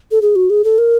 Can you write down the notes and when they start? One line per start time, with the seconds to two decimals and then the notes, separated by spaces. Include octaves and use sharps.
0.11 A4
0.22 G#4
0.36 F#4
0.50 G#4
0.64 A4
0.78 A#4